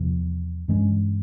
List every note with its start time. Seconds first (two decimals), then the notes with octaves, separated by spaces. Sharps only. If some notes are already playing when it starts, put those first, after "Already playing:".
Already playing: E2 C3 F3
0.68 G2 E3 G#3 C#4